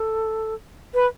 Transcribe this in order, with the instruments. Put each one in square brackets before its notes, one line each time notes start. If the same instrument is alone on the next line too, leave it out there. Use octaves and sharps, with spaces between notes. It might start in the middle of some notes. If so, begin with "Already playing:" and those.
Already playing: [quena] A4
B4